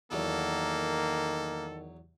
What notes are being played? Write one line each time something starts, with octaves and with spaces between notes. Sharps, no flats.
E2 D#3 F#3 A#3 A4